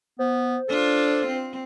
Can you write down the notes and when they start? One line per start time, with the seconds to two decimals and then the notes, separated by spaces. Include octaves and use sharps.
0.19 B3 C5
0.68 D4 F4 A4
1.27 C4